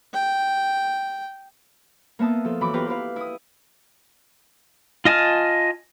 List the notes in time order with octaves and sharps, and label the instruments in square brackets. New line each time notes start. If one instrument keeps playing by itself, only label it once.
[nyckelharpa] G5
[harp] A#3 B3 E5 A5 D#6
F3 A4
F#2 E3 B5 D6
B3 F4 G4 B4 A#5
E4 G4 B4 F5
E4 D#6
[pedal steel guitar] F4 D#5 G#5 A5 F6